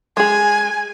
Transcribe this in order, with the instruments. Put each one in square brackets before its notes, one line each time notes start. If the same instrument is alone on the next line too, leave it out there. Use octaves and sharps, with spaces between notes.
[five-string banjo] G#3 G#4 [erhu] G#5